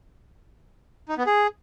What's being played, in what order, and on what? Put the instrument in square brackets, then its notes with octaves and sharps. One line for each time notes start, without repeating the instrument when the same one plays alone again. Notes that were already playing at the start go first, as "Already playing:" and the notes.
[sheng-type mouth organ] D#4
B3
G#4